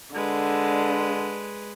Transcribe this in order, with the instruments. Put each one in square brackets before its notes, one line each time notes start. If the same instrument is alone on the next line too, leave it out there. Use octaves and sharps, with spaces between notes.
[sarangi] D3 [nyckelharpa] G#3 B4